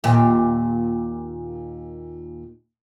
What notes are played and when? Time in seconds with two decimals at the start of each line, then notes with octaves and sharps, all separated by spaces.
0.04 D#2 A#2 G4